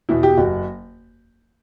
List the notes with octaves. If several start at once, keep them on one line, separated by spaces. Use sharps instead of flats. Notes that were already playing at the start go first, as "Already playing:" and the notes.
E2 B2 E4
G4
F#1 F#4